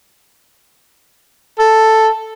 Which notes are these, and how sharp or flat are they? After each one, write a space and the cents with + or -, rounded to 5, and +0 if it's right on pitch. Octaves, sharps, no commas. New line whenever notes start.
A4 +5